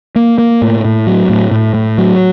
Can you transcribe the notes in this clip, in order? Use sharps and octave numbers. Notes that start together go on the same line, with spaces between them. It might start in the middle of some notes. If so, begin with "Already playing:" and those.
A#3
A#3
A2
A2
F#3
A2
A2
A2
F#3